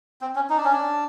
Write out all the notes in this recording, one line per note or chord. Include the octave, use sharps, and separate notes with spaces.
C4
C#4
D#4
D4
C#4
D4